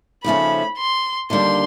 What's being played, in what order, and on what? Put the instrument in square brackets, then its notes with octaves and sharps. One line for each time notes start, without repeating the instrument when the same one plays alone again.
[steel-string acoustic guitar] D#2 C#3 F3 A3 C#4 [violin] B5
[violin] C6
[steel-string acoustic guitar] D#2 D3 G3 A#3 D4 [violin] C6